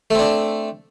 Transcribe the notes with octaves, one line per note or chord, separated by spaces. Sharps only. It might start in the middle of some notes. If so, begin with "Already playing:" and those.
A3 C4 D4